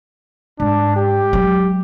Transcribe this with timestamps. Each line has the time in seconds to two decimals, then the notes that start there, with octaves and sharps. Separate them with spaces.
0.60 G#2 D4
0.96 G4
1.33 F#3 G#3